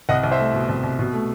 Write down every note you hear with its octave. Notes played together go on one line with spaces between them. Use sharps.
C2 D#5 F#5
C2
C5 E5
A3
B2
C2
C2
B2
A3